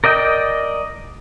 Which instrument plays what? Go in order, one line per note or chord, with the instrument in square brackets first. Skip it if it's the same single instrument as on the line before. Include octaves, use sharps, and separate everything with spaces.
[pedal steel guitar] A#4 D5 D#5 G5